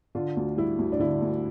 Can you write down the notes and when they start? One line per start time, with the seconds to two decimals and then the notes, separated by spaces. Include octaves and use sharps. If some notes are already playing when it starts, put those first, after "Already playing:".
0.15 D3 F4
0.37 D2
0.57 G3 E4
0.79 D2
0.92 D4
0.99 D3 E4
1.22 D2